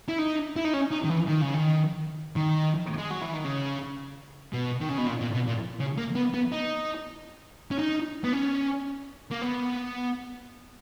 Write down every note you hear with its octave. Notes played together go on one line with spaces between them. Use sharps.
E4
D#4
E4
D#4
C#4
D#4
D#3
E3
D#3
C#3
D#3
D#3
G#3
F#3
E3
D#3
C#3
B2
D#3
C#3
B2
A#2
A#2
B2
A#2
C#3
A#3
B3
B3
D#4
C#4
D#4
B3
C#4
A#3
B3